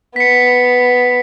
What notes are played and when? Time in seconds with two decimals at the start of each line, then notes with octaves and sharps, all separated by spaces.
0.16 B3 B6 C#7